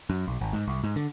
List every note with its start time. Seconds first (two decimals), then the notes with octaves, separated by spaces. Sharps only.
0.10 F#2
0.27 B1
0.41 G#1
0.53 G#2
0.67 C2
0.84 G#2
0.96 D3